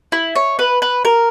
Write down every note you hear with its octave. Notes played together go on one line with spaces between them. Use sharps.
E4
C#5
B4
B4
A#4